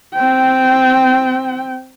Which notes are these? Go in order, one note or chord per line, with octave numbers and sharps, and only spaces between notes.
C4 G5